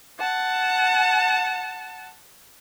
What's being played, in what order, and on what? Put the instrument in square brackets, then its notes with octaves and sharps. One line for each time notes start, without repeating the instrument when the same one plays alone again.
[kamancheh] F#5 A5